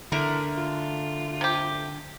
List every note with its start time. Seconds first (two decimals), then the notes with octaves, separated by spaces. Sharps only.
0.12 D3 A3 E4 A#4 A#5
0.58 F4
1.41 C3 G4